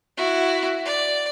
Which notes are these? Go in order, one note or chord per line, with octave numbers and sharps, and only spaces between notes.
E4 F#4
D5